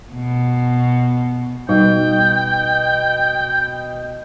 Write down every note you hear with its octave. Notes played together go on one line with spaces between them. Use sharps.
B2
B2 G3 D#4 G5